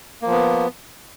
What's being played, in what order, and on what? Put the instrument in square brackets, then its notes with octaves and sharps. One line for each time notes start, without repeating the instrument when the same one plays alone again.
[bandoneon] A#3
F3
B3